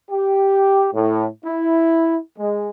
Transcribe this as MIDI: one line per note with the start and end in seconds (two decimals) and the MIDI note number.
0.11 0.89 67
0.94 1.26 45
1.45 2.17 64
2.39 2.70 56